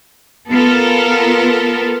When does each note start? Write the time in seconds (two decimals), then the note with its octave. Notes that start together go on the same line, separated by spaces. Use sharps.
0.51 B3 F4 A4 A#4